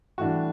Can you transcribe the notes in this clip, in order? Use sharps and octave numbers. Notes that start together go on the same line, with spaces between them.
A2 E3 G3 D4 F#4